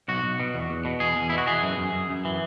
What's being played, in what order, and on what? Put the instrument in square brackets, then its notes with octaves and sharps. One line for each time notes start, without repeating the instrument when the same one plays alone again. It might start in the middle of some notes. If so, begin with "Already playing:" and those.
[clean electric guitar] B1 F#4
B1
B2
E2
E2
B2
E2 G#4
E2
B2 E4
F#4
E3 G#4
F#2
F#2
F#2
F#2
E3